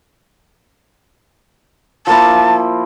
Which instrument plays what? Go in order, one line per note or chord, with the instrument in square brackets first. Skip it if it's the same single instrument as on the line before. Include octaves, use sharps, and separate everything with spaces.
[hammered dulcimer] F3 A#3 E4 [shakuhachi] A5